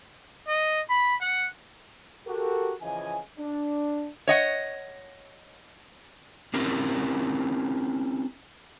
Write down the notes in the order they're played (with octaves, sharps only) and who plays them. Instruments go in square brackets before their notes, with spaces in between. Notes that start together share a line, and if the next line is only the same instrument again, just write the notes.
[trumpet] D#5
B5
F#5
[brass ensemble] F#4 G4 A4 A#4
C#3 E3 F3 D#5 G#5
D4
[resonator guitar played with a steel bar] C#5 D#5 F#5
[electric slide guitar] C4 C#4 E4 G4 A#4